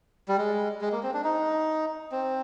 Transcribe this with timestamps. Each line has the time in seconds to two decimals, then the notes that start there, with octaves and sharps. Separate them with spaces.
0.28 G3
0.38 G#3
0.81 G#3
0.92 A#3
1.03 C4
1.14 D4
1.24 D#4
2.12 C4